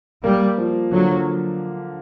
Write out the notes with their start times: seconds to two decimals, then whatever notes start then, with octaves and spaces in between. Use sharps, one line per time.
0.24 G3 A#3
0.58 F3
0.92 D3 F#3